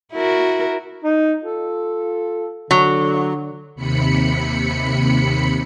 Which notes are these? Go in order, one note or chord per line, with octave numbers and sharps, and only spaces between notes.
E4 F#4 A#4
D#4
F4 A4
D3 F#3
D#2 C3 B5 C#7